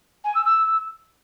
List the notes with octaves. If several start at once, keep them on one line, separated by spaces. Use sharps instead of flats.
G#5
E6
E6